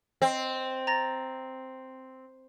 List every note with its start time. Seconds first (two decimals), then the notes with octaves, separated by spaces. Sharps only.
0.22 C4 D#5
0.87 A#5 A6 A#6